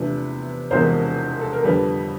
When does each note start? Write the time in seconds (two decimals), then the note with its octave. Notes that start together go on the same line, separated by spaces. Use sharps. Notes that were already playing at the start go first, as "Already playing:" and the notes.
Already playing: E2 C3 F3 A3 D4 B4
0.71 E1 E2 C3 F3 G#3 A#4 C5
1.41 A4
1.53 A#4
1.64 F2 D3 G3 A4 B4